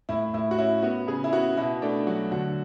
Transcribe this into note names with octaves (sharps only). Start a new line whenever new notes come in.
A2 E4
A2 E4
F#4
C#4 E4
B3 F#4
C#3 G#4
E4
B3 F#4
B2 E4
A3 D4
F#3 F#4
D3 F#4